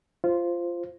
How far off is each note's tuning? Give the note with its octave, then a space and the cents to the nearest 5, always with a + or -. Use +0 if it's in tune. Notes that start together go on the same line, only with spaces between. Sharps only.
F4 -15 C5 +0